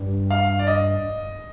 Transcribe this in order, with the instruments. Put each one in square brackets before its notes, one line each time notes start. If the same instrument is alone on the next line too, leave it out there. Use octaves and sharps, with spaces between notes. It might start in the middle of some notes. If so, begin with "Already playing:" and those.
Already playing: [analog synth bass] G2
[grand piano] F5
D5
D#5